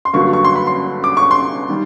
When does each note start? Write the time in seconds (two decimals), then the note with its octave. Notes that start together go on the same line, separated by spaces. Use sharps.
0.05 C6
0.14 G2 D3 F#3 A#3 C#6
0.33 C#6
0.44 C6
0.56 B5
0.67 C6
1.04 D6
1.17 C#6
1.31 C6
1.70 D#3 G3